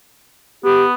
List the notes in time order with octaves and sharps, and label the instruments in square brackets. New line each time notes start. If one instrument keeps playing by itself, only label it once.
[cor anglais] B3 [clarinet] G4